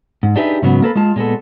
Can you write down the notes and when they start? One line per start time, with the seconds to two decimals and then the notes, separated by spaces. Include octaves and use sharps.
0.23 G#2
0.36 D4 D#4 G4 G#4 B4 E5
0.62 G#2 C#3 F#3 B3
0.82 A#3 A4 B4
0.96 G#3 F4 A5
1.16 A#2 G#3 B3 A4